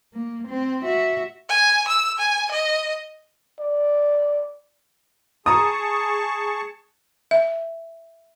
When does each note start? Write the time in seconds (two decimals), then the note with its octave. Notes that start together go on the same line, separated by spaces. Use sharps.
0.14 A#3
0.48 C4
0.83 F#4 E5
1.49 G#5
1.87 E6
2.19 G#5
2.51 D#5
3.60 D5
5.46 G#4 A5 A#5 C#6 D#6
7.31 E5